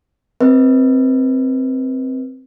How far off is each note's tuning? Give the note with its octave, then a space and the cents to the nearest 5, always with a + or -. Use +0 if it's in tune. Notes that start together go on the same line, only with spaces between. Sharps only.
C4 +0 B4 -30 D#5 +35